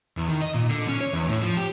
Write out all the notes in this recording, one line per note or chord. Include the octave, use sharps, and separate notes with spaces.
E2
D#3
D#5
A#2
D3
C#4
C#5
E2
A2
F3
G4